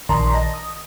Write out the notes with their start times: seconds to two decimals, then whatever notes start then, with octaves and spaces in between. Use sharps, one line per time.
0.09 A#1 D#3 D5 A5 A#5 C6
0.34 D#5 A5 A#6
0.54 D#6